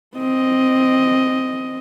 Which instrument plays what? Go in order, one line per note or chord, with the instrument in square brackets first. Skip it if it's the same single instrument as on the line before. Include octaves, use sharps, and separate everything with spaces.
[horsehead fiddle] C4 D#5